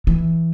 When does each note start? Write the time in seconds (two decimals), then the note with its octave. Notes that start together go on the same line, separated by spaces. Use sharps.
0.07 E3